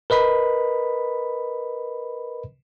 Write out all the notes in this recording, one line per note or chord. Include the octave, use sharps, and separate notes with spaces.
A#4 B4 D#5 B5